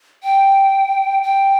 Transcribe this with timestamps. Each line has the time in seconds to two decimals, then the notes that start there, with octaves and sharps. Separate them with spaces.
0.23 G5
1.23 G5